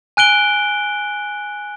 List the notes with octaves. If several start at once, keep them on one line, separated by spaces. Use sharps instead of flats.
G#5 F#6 D7 G7